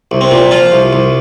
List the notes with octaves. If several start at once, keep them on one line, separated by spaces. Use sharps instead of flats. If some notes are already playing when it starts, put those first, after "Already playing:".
C2
C4
A#2
F3 F4
C2
C2